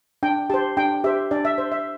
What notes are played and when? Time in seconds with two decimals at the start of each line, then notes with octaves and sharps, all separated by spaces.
0.23 D4 G5
0.50 G4 C5 A5
0.77 D4 G5
1.04 G4 C5 E5
1.31 D4 D5
1.45 E5
1.58 C5
1.72 E5